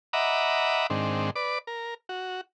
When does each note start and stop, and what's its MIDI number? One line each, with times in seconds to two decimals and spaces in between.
0.13 0.87 75
0.13 0.87 76
0.13 0.87 78
0.13 0.87 82
0.13 0.87 83
0.13 0.87 86
0.90 1.30 44
0.90 1.30 51
0.90 1.30 60
0.90 1.30 62
1.36 1.59 71
1.36 1.59 74
1.36 1.59 86
1.67 1.94 70
2.09 2.41 66